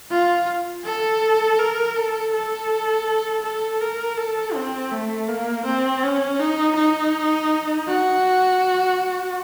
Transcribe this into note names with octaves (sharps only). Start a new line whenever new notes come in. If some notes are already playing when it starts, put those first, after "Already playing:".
F4
A4
A#4
A4
A4
A4
A#4
A4
C4
A3
A#3
C4
C#4
D#4
D#4
F#4